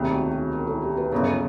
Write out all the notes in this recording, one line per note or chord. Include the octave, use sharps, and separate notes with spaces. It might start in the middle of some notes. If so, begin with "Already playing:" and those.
Already playing: E1 D2 C3 D#3 G4
F#4
G#4
A#4
A4
G4
B4
G1 F#2 C#3 A#4
A4